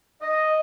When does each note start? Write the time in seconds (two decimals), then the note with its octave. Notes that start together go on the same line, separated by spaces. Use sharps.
0.21 D#5